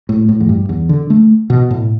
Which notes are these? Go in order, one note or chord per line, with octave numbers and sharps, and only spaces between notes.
A2
A2
E2
G2
E2
D3
A3
B2
A2